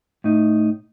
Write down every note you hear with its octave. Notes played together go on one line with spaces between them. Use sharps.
A2 D#4